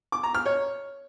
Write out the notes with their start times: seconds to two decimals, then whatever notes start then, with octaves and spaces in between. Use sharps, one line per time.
0.12 D6
0.23 A#5
0.35 F6
0.46 C#5